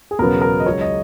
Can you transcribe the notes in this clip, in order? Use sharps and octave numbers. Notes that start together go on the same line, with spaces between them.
G#4
E1 E2 C#3 F#3 B3 A#4
A#4
D#5
C#2 C#3 F#3 C#5
D#5